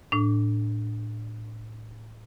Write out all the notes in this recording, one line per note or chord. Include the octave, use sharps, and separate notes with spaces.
A2 D4